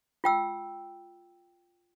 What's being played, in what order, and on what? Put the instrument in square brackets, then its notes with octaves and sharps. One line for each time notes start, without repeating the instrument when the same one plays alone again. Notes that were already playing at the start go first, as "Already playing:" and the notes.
[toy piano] F4 G5 E6